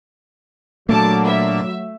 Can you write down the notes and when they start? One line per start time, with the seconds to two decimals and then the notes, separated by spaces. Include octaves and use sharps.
0.89 A#2 F#3 A3 D4 A5 D6
1.24 E5